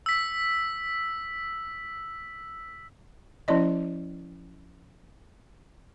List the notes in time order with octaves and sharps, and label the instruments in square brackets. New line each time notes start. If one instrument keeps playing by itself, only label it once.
[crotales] E6 B6
[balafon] F3 C#4 E4 D5 D#5